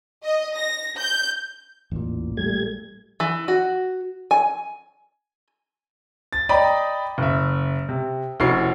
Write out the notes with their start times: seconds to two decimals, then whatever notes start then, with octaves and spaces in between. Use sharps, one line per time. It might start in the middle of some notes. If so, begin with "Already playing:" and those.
0.24 D#5
0.57 A#6
0.98 G6
1.92 A1 E2 A#2
2.37 G3 A3 G#6
3.20 E3
3.48 F#4
4.31 G#5
6.33 A6
6.49 D5 D#5 G5 A#5 B5 D#6
7.18 F#1 E5
7.89 C3
8.40 F1 C#4 E4 F#4 C#6 C7